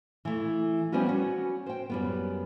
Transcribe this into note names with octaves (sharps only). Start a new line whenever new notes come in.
E3 A3
F3 G3 B3 C#4 F#4
C#4 F#4
C5 G5
F#2 G3 B3